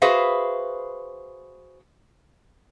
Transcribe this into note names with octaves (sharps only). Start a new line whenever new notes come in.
F#4 G#4 B4 C5 E5 F5